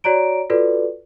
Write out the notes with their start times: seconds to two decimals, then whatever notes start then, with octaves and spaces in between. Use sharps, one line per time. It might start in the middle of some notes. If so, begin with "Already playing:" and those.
0.04 F#4 C#5 D5 A#5 D7
0.50 F4 F#4 A4 B4 D5